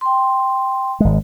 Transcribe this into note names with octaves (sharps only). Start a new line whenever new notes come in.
G5 C6
G#1 G#3